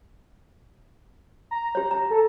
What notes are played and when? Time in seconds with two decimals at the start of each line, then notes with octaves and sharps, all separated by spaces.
1.51 A#5
1.75 G4 C#5
1.91 A#5
2.10 A4